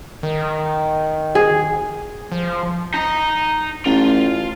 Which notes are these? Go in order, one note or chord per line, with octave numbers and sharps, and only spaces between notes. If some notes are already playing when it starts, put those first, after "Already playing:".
D#3
G#4
F3
D#4 A#5
A1 F4